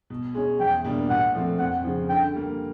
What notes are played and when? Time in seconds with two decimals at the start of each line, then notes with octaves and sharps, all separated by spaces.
0.10 B2
0.35 G#3 C#4
0.60 E2 G5
0.84 B2 G3 A#3 D4
1.10 A#2 F#5
1.35 F3 A3 C4
1.59 F2 F#5
1.84 C#3 F3
2.09 D3 G5
2.34 G3 A#3